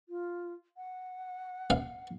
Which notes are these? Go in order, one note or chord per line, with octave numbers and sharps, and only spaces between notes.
F4
F#5
F5